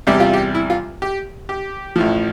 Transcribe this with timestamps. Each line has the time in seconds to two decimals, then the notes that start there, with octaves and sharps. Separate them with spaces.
0.07 E2 C3 G3 G4
0.20 F4
0.33 G4
0.55 E4
0.70 F4
1.02 G4
1.49 G4
1.96 A1 A2 F3